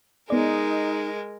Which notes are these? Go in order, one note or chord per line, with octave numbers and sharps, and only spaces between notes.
G#3 B3 D#4 A#4 D5